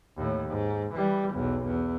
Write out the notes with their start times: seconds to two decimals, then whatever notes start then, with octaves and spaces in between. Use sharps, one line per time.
0.17 D#2 A2
0.49 G#2
0.94 E3 G3
1.34 B1 E2
1.66 E2